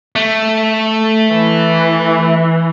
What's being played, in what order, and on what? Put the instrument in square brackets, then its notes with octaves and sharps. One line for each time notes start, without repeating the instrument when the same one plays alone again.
[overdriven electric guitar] A3
[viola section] E3